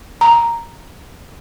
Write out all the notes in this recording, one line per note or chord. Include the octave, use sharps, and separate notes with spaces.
A#5